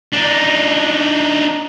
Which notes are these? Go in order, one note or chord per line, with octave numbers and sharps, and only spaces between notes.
D4 D#4